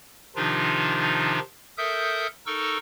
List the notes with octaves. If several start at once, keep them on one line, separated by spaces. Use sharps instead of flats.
C3 D#3 F3 D4 D#4 F4
A4 A#4 E5 D#6 G6
D#4 A4 A#4 C#6 E6